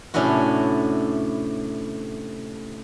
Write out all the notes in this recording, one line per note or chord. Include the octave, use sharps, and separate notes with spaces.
A2 C3 C#4 D4 E4 F#4